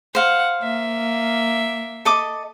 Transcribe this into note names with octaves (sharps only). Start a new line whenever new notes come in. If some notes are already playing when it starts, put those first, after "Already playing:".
C5 F5 F#5
A#3 E5
A4 D#5 D6